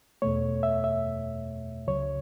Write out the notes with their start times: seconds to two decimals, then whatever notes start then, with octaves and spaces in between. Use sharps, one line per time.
0.22 E2 B2 A3 C#5
0.63 E5
0.84 E5
1.87 C#2 C#3 F#3 C#5